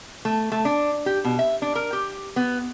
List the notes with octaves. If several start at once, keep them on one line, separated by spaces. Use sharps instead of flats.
A3
A3
D4
G4
B2
E5
D4
A#4
G4
B3